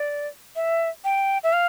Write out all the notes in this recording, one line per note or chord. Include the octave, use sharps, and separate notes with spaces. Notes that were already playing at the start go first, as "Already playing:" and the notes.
Already playing: D5
E5
G5
E5
F5